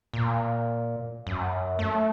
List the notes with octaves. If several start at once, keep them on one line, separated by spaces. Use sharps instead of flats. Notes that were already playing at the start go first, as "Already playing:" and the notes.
A#2
F#2
A3